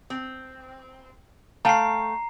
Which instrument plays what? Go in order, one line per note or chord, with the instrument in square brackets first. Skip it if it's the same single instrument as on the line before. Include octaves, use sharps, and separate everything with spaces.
[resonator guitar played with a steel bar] C4
[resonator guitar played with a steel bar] A3 F5 G5 [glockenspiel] A#5 C7